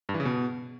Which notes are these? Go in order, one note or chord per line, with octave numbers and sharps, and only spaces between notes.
G2
E3
C#3
B2